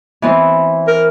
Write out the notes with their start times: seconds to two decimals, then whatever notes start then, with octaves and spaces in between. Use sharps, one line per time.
0.22 E3 B3 C4
0.88 A#4